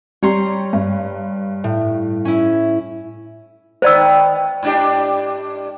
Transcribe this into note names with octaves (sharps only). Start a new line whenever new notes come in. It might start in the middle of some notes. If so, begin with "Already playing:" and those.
G3 C#5 A#5 C6
G2
A2
C#4 E4
D#3 B3 C5 D5 E6
G#2 D4 G4